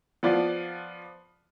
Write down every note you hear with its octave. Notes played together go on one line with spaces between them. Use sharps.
F3 B3 F4 D5